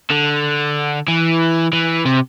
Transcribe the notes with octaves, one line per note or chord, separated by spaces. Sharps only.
D3
E3
E3
C3